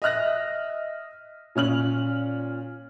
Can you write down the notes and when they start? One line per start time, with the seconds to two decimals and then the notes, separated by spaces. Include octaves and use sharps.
0.02 D#5 E5 F6 F#6 A#6
1.55 A#2 C#4 F6 F#7